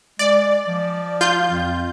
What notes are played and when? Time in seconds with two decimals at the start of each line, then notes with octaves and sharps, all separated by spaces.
0.19 G#3 D5
0.67 F3
1.21 F4 G6
1.51 F2